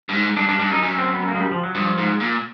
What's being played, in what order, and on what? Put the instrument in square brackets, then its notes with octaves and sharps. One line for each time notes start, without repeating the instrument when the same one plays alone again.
[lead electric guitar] G2
G#2
[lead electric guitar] G2 [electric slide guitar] D4
[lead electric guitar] G2 [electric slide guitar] D4
[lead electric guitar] G2 [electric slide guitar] D4
[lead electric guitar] F#2 [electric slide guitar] D#4
[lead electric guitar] F#2 [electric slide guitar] C#4
[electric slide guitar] C4
B3
A#3
G#3
G3
F3
F#3
[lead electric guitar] G2 [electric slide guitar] F3
[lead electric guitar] G#2
A#2